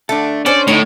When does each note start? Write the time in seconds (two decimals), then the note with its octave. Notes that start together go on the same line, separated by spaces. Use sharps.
0.09 A3 D4 A4
0.46 C#4 C5 D5
0.68 A2 D3 D#4 C#5